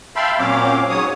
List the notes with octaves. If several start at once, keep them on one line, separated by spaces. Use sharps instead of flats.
E5 F5 G5 A5 B5 C6
A#2 F#3 C4 C#4 F5 D6
G#2 F#3 C#5 D#6